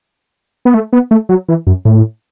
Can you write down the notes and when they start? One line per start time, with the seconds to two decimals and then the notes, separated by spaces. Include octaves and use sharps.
0.65 B3
0.74 A3
0.93 B3
1.11 A3
1.29 F#3
1.49 E3
1.67 F#2
1.85 A2